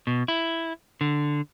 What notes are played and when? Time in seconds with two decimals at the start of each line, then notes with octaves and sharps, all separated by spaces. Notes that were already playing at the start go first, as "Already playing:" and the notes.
0.07 B2
0.28 E4
1.01 D3